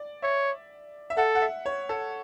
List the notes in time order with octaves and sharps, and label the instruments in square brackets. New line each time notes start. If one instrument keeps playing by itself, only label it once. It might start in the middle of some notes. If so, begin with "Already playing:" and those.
Already playing: [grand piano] D5
[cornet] C#5 [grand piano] E5
[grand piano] E5
[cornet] A4 [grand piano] F#5
[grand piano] F#5
E5
C#5
A4